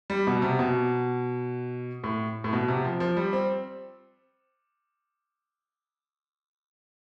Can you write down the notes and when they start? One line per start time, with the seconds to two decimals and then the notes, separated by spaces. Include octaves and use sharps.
0.10 G3
0.27 B2
0.42 C3
0.59 B2
2.04 A2
2.44 A2
2.53 B2
2.68 C3
2.84 F3
3.00 F3
3.17 G3
3.33 C4